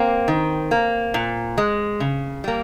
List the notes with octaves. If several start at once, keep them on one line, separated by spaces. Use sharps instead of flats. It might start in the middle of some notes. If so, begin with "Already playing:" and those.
Already playing: A#3 C4
D#3
A#3
A#2
G#3
C#3
G3 A#3